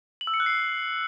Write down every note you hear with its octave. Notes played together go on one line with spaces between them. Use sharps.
F#7
E6
C#7
F#6
C7